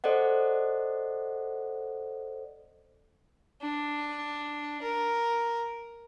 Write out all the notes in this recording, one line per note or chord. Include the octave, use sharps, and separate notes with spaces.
A4 C5 D5 D#5 F#5
D4
A#4